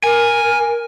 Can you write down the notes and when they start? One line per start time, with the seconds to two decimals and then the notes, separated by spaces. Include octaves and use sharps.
0.04 A#4 G#5